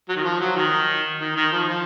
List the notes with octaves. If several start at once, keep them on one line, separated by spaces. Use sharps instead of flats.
F#3
D#3
F3
F#3
D#3
D#3
D#3
F3
F3